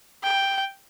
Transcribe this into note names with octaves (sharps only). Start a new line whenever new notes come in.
G5